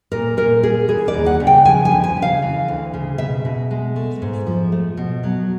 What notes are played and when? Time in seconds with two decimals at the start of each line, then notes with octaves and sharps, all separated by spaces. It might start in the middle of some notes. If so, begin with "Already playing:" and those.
0.12 A#2 A#4
0.37 A#2 A#4
0.63 G3 G#4
0.88 E3 G#4
1.08 D5
1.14 D#2
1.26 F#5
1.40 C#3
1.47 G5
1.65 F3 G#5
1.85 G#5
1.92 D2
2.04 G#5
2.17 C#3
2.22 F5
2.42 E3
2.68 D2
2.94 C#3
3.18 B2 E5
3.45 B2
3.71 G#3
3.96 A3
4.22 G#2
4.47 F3
4.72 A3
4.97 B2
5.23 F#3